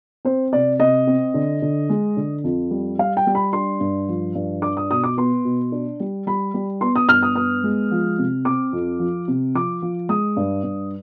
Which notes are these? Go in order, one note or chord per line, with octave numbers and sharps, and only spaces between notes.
C4 C5
C3 D5
C3 D#5
C4
D3
D3
G#3
D3
F2
G3
G3 F5
G5
G3
B5
D4 C6
G2
F3
G2
D4 D6
D#6
B2 D#6
D6
B3 C6
B2
D4
G3
G3 B5
G3
B3 C6
D#6
G2 F6
D#6
B3 D#6
G#3
F3
C3
C4 D6
F2
F3
C3
F3 D6
F3
G#3 D#6
G2
G2